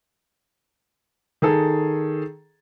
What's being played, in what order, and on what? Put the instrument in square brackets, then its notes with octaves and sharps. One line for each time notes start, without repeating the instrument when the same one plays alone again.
[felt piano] D#3 G#4 A4